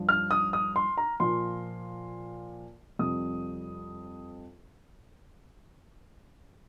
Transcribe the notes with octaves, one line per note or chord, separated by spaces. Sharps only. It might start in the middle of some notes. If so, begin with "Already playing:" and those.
Already playing: G2 F3
F6
D#6
D#6
C6
A#5
A#2 F3 C6
F2 C3 G3 D#6